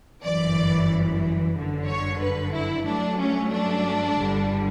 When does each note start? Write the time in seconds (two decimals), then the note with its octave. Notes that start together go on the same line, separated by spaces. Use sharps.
0.23 G1 F#2 E3 D5
1.54 G1 F#2 D3
1.87 C#5
2.21 B4
2.53 E4
2.86 G2 F#3 A3 D4
3.19 C#4
3.51 D4
4.18 G1 G2 D3 G3